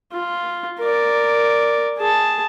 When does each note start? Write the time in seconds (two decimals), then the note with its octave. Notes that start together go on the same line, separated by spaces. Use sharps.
0.13 F4
0.80 A#4 D5
1.99 G#4 A5